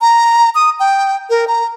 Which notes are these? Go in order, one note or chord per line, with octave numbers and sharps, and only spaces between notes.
A#5
D#6
G5
A#4
A#5